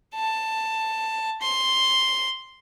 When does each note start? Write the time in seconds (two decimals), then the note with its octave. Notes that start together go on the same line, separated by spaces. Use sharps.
0.15 A5
1.42 C6